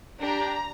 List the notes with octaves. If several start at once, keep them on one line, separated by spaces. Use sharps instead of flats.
D4 G4 A#5